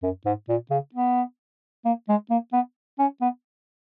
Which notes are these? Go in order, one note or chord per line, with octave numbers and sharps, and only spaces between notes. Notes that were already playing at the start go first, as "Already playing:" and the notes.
F#2
G#2
A#2
C#3
B3
A#3
G#3
A#3
B3
C#4
B3